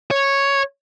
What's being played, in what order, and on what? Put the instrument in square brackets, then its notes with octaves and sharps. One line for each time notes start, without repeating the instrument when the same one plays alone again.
[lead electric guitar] C#5